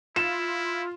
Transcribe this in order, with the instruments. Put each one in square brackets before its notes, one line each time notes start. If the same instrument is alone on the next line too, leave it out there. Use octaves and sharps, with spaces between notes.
[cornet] E4 [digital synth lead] F4 [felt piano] E7